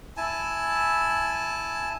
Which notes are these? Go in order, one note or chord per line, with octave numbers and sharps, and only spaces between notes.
E4 G#5 A5